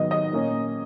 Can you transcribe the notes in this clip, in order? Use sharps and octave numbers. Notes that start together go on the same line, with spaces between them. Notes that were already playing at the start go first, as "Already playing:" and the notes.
Already playing: G#2 D#3 F#3 B3 D#5
D#5
A#2 A#3 C#4